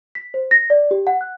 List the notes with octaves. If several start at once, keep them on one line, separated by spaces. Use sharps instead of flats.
B6
C5
A#6
D5
G4
F#5
F#6